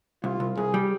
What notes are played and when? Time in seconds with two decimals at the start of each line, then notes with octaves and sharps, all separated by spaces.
0.24 C2 F4
0.40 C2
0.57 C2 G#4
0.74 G3